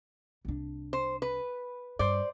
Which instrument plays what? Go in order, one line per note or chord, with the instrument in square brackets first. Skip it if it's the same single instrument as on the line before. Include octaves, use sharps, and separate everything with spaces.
[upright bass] C2 D4
[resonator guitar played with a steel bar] C5
B4
[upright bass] G2 [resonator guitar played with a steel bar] C5 D5